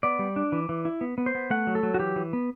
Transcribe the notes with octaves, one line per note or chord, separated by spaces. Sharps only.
B3 D5
G3
D4
E3
E3
E4
B3
B3
C5
B3
A3 F#5
F#3
A4
F#3
F#4
E3 G4
E3
B3